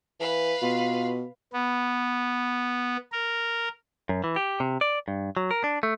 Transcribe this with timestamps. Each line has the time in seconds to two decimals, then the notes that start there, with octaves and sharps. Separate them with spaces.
0.20 E3 B4 F5
0.62 B2 F4
1.53 B3
3.12 A#4
4.09 F#2
4.24 E3
4.36 G4
4.60 C3
4.81 D5
5.08 G2
5.37 F#3
5.51 A#4
5.64 D4
5.83 A3